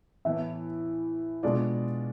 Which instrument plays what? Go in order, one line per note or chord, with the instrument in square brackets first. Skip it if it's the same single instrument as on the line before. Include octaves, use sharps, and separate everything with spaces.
[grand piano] A2 E3 B3 [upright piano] E5
[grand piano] B2 G#3 D4 F4 [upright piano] D5